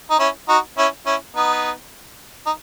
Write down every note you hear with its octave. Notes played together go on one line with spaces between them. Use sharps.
D#4
C#4 E4
D#4 F#4
C#4 E4
C#4 E4
B3 D#4
D#4